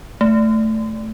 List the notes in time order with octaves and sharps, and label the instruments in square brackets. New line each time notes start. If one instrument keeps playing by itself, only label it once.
[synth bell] A3